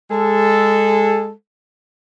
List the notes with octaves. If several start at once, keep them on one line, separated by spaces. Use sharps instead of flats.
G#3 A4